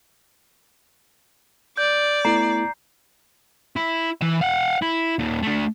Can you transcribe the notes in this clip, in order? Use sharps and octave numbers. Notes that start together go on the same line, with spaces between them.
D5 G6
A3 B3 E4 A#5 C7
E4
E3 E5
F5 F#5
E4
D#2 A#2
A3 D4